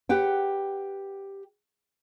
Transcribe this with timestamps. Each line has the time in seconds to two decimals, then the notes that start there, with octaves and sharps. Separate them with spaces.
0.09 G4 B4 F#5 G5